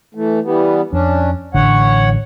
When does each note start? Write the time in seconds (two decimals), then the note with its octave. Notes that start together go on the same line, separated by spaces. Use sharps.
0.15 E3 A3
0.44 E3 G3 B3
0.93 F2 C#4 D4
1.54 A1 D3 C#5 F#5